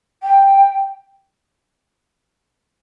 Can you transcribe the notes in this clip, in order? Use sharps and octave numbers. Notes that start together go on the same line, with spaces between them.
G5